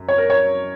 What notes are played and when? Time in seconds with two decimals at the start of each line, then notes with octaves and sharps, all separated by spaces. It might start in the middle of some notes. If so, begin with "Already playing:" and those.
Already playing: F#2
0.08 C#5
0.18 A#4
0.30 C#5